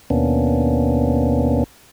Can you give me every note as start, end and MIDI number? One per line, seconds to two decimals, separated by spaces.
0.10 1.64 39
0.10 1.64 47
0.10 1.64 58
0.10 1.64 59
0.10 1.64 61
0.10 1.64 62